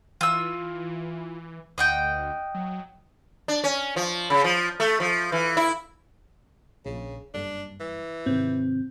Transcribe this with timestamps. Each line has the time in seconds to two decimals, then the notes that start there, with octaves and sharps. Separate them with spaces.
0.21 E3 F4 E6
1.78 D2 D#5 F#5 G5
2.55 F#3
3.48 D4
3.64 C#4
3.96 F3
4.30 C#3
4.44 F3
4.80 A3
5.00 F3
5.32 E3
5.57 E4
6.86 A#1 C#3
7.34 F#1 G2 D4
7.80 E3
8.26 G#2 C3 D#3 C4